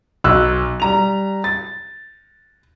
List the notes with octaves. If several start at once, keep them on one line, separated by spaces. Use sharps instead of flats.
B1 E6 F#6
G3 A#5 F7
A6